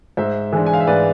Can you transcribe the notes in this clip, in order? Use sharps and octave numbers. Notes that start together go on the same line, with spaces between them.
G#2 C5 E5
E3 G#3 D4
G#5
F5
E5
G#2 B4 D5